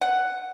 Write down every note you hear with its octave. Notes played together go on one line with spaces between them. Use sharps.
F#5